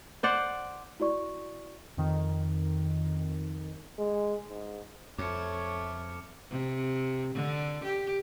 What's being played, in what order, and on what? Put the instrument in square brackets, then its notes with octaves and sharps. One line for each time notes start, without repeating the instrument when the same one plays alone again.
[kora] C5 D5 F#5
[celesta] E4 F#4 D5 C#6
[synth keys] F2 D#3
[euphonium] G#3
G#2
[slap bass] F2 [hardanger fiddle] A3 [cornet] C#5 [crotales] D6 F6 C#7
[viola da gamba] C3
D3
G4